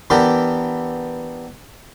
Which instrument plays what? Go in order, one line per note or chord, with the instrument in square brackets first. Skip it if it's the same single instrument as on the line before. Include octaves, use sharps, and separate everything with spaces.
[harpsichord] E3 B3 D4 G4 A#4 D5